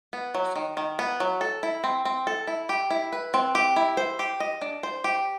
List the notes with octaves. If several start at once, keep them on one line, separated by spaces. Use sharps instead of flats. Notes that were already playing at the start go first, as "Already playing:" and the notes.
B3
F#3
D#3
D#3
B3
F#3
A4
E4
C4
C4
A4
E4
G4
E4
B4
C4
G4
E4
C5
G4
D#5
D4
C5
G4